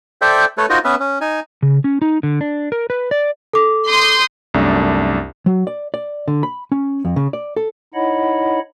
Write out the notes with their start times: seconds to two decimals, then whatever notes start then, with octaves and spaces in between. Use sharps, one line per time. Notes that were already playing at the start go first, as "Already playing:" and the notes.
0.22 A4 C5 D5 E5 G5
0.58 A3 A4 B4 C#5
0.70 D#4 F4 F#4 A#4 C5 D#5
0.84 B3 C#4 B4 E5
1.00 C#4
1.21 D#4 G#5
1.63 C#3
1.84 C#4
2.02 D#4
2.23 D3
2.41 D4
2.72 A#4
2.90 B4
3.11 D5
3.53 A4 D6
3.86 C6 D#6 G6
4.54 C2 F#2 A3 D4
5.46 F#3
5.67 D5
5.94 D5
6.28 D3
6.43 B5
6.72 C#4
7.05 F2
7.16 C#3
7.33 D5
7.57 A4
7.94 D#4 E4 C#5 D#5 F#5 B5